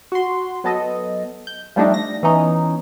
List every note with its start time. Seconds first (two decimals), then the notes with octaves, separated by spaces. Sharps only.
0.12 F#4 C6
0.64 F#3 B3 A4 D#5
1.47 G6
1.76 F3 G3 A3 D4 D#4 G4
1.94 A#6
2.23 E3 B3 C#4 D#4